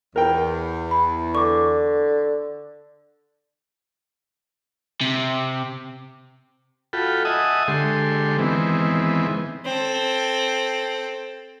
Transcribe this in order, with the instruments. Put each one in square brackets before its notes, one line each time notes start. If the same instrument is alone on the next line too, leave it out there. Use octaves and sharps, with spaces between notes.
[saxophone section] E2 [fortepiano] A#4 G5
[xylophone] B5
[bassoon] D3 [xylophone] C#6 D6
[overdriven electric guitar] C3
[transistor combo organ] F4 F#4 A4 G5 B5
D#5 E5 F#5 G#5 A5 D#6
D3 G#3 G4 A4 C6
D#3 E3 G#3 B3 C4
[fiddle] C4 A4